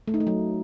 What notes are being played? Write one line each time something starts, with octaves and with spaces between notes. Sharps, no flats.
A3
D#4
A3
F#3